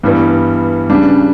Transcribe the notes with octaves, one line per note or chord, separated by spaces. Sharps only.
G2 E3 G3 B3
C#3 G3 D4